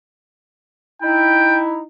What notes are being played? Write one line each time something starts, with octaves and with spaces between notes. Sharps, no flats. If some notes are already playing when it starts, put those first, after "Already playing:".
D#4 E4 G5